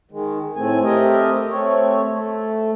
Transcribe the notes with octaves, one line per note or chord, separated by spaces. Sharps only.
D#3 G#3
A2 A3 C4 G#5
A3 C4 G4 A#4 D#5
A3 C4 C#5
A3